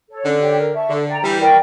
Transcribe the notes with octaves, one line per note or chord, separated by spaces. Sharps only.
A4 C#5
D3 C#4
G4 C#5 G5
A#4
E5 A5 C#6
D3 A4
D5 G5 A#5
E3 G3 G4
A#4 D5 G5